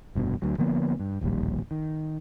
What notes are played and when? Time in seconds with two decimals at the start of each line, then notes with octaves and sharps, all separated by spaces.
0.15 F1 G2 B2
0.42 D2 F#3
0.58 D3 F3 A#3 B3
1.00 G2
1.21 D1 A#1 D#2 G3
1.71 D#3